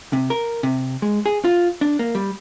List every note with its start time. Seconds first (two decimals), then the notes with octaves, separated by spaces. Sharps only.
0.13 C3
0.30 A#4
0.63 C3
1.02 G#3
1.26 G#4
1.44 F4
1.81 D4
1.99 A#3
2.15 G3